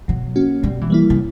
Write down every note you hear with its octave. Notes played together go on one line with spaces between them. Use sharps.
B2 F#3
A#3 C#4 F#4
B2 G3
E3
G3 A#3 E4
C#3